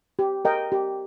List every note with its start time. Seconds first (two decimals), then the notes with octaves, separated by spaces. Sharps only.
0.19 G4
0.45 A#4 D#5 G5
0.72 G4